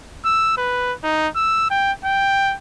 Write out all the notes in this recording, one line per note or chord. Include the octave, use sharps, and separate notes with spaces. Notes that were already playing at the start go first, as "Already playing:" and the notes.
E6
B4
D#4
E6
G5
G5